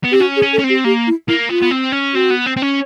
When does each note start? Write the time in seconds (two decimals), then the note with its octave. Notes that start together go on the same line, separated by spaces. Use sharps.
0.04 B3
0.12 C4 G4
0.20 C#4 F#4
0.36 G#4
0.42 C#4
0.53 A4
0.59 C#4
0.64 C4
0.69 G4
0.85 A#3 G4
1.07 E4
1.28 A#3 E4
1.49 B3 F4
1.62 B3
1.71 C4
1.92 C#4
2.14 C4 F#4
2.30 B3
2.46 C4
2.57 C4
2.62 C#4